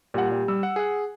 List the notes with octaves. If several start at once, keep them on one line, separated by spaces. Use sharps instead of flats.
A#2 G3 F#5
G3
G3 E6
F#5
G#4 F#5